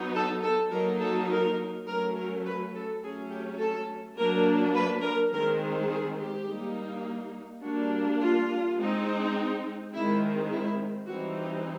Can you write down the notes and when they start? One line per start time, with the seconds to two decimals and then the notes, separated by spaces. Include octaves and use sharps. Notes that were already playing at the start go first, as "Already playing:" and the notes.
Already playing: F#3 B3 D#4
0.16 A4
0.43 A4
0.72 F#3 A#3 D#4 A#4
1.01 A4
1.30 A#4
1.87 F#3 A3 C#4 A#4
2.16 A#4
2.45 B4
2.74 A4
3.03 F#3 A3 C#4 G#4
3.31 G4
3.60 A4
4.17 F#3 A#3 D4 A#4
4.75 B4
5.03 A#4
5.32 D#3 G#3 C4 A#4
5.91 G#4
6.18 G4
6.48 G3 A#3 D#4
7.63 G3 A#3 D4 F#4
8.20 F4
8.77 G#3 C4 D#4
9.92 D#3 G#3 C4 E4
10.50 E4
11.08 E3 G3 C4 D#4 F#4
11.36 G4